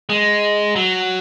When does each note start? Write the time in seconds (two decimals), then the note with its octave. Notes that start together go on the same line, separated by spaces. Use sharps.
0.09 G#3
0.76 F#3